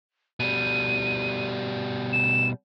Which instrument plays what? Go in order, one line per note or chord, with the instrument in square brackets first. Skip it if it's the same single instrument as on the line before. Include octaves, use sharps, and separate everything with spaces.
[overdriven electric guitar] B2 G3 [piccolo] D#7
[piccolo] E7